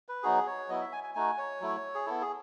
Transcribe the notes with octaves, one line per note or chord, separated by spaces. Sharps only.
B4
F#3 B3 D#4 F#4 G#4
C#5
F#3 B3 E4 D#5
E5
G#5
G#5
A3 D#4 F#4 G#5
C#5
F#3 A3 E4
G#4
B3 E4 A4
G#4